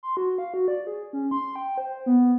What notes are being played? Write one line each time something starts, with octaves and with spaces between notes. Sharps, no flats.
C6
F#4
F5
F#4
D5
G#4
C#4
C6
G5
C5
B3